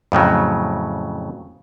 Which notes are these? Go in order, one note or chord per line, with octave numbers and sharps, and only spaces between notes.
F2 A2 C#3 F#3